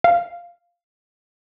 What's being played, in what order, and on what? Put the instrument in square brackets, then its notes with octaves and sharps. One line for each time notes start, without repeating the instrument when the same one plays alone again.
[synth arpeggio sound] F5